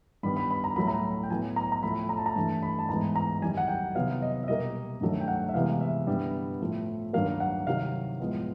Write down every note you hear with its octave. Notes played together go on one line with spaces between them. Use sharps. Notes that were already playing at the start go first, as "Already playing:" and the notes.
G2 D#3 G3 B3 B5
B5
B5
A#5
A2 F#3 A3 B5
A#5
G5
A2 F#3 B3 G#5
A#5
A#5
A2 F3 A3 B5
A#5
A5
A#5
G2 E3 A3 A5
B5
A5
G#2 E3 G#3 B3 A#5
A#5
F#2 D#3 G3 G#5
F#5
G5
C3 D#3 F#3 B3 F5
D#5
E5
B2 G3 A#3 D#5
G2 D#3 F#3 A3
G5
F#5
E5
C3 E3 G#3 B3 F5
F5
E5
G2 D3 G3 B3
A2 F3 A3
G2 D#3 F#3 A#3 F5
F#5
C3 D#3 F#3 F5
A2 F3 G#3 B3